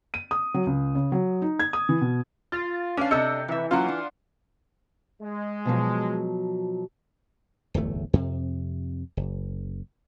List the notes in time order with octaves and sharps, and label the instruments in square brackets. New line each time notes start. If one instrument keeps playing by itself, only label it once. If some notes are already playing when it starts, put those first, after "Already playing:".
[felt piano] D#7
D#6
F#3
C#2
C#3
F#3
D#4
G#6
D#6
E3
B2
[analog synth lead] F4 [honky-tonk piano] A6
[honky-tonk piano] C#4 [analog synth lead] D4 [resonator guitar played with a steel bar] B4 F5
[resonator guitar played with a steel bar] C3 A4 D#5 [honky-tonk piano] E6 G6 C#7
[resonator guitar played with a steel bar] C3 E5 [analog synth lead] E3
[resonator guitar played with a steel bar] F#3 A#3 C#4 [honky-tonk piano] F4 F#5
[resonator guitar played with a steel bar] D4
[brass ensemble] G#3
[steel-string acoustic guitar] B2 F3 F#3
[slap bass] D1 G1 E2 A3
F2 C3
F#1